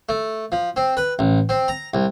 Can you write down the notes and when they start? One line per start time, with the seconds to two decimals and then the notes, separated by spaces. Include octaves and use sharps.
0.09 A3
0.52 F3
0.76 C4
0.97 B4
1.19 A1
1.49 C4
1.68 A#5
1.94 C2